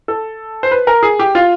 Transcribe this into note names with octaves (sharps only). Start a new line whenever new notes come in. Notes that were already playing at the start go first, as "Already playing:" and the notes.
A4
C5
B4
A#4
G#4
G4
F4